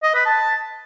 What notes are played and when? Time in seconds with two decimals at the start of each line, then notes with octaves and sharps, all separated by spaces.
0.03 D#5
0.15 B4
0.26 A5